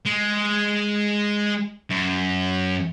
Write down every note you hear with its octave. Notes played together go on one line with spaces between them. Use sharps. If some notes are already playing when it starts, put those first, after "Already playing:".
G#3
F#2